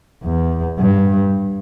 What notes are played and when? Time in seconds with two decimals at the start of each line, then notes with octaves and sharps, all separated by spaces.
0.23 E2
0.79 G2